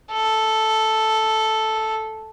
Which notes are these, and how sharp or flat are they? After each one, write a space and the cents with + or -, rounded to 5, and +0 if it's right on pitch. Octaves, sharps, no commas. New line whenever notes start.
A4 -5